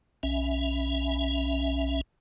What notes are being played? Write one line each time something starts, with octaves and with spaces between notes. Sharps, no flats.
B1 C#4 E5